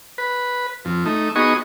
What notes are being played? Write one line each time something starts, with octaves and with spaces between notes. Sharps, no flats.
B4
F2
A3 D#4
B3 D#4 F#4 G#4 D#5 C#6